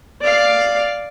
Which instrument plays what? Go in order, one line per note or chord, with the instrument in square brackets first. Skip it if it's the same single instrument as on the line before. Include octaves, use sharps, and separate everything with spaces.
[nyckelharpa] D5 F5